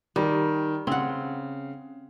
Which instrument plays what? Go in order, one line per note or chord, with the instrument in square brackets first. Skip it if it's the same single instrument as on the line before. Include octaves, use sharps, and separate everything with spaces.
[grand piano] D#3 [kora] G3
[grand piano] C#3 [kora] C4 F#5